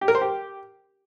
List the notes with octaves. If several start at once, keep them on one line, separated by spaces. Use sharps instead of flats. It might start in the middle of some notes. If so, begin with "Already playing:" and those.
G4
A#4
C5
G4